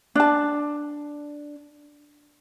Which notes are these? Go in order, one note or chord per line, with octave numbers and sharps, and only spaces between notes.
D4 A5